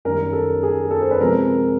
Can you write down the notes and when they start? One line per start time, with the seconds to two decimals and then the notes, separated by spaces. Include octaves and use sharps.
0.05 F#2 D#3 G3 A#4
0.33 A4
0.63 G#4
0.91 A4
1.01 C5
1.11 B4
1.20 C3 F3 G#3 C4 A#4